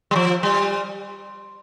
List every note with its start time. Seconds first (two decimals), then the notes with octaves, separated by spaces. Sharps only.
0.11 G3
0.16 F3
0.43 G3